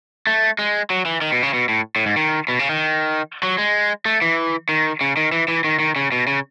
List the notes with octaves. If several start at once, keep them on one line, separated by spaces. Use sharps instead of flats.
A3
G#3
F#3
E3
D#3
B2
C#3
B2
A2
A2
G#2
D#3
B2
C#3
D#3
F#3
G#3
A3
E3
D#3
C#3
D#3
E3
E3
D#3
D#3
C#3
B2
C#3